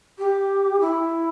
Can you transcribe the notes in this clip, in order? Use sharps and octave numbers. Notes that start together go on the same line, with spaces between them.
G4
E4